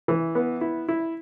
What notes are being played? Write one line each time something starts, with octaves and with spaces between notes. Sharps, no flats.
E3
B3
E4
E4